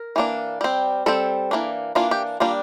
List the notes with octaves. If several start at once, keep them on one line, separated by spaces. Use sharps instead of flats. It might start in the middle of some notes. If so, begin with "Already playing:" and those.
Already playing: A#4
E3 A#3 D4
G3 C4
G3 C4 A4
E3 A#3 D4
E3 A#3 D4 F4
G4
G3 A#3 D4 F4